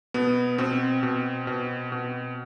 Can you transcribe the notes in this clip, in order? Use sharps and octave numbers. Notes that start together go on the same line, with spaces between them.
B2 B3
B2 C4
B2
B2
B2